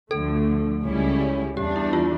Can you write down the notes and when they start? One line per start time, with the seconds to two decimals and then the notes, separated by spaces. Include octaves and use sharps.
0.11 D2 D3 F3 A3 A4
0.84 C#2 C#3 G3 C#4 E4
1.57 E2 E3 G3 D4 G4
1.76 E4
1.93 F4